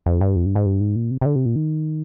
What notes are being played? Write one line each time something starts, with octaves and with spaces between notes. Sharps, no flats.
F2
G2
F2
G2
G#2
G2
G#2
A#2
C3
C3
D3
C3
A#2
D#3